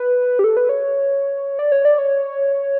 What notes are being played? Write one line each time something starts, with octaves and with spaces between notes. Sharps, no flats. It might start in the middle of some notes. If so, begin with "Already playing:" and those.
Already playing: B4
G4
A4
B4
C#5
D5
C#5
D5
C#5